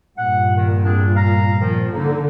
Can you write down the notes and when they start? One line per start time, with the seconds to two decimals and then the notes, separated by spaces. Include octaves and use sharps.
0.17 G2 A#2 F#5
0.56 D#3
0.84 C4 D4 G#4
1.15 F5 A#5
1.59 D#3 F3
1.93 D3 A#3 D#4